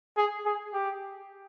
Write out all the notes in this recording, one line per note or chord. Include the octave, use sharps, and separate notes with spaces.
G#4
G#4
G4